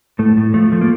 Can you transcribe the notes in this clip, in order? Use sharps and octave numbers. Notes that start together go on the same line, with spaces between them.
A2 A3
A2
F3 A3
F3 A3
A#3